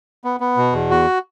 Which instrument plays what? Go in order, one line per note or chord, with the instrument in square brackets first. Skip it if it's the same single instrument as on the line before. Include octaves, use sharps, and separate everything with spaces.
[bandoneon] B3
B3
B2
E2
F#4